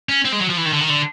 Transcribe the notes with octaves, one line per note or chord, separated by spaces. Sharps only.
C#4
C4
G#3
F#3
F3
E3
D#3
D3
D#3
D3